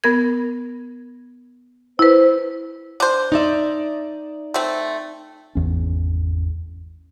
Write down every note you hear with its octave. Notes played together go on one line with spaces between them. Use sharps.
B3 A#4 G#6
E4 B4 C5
D4 C5
D#4 D5 E5
A3 C4
G#1 E2 C#4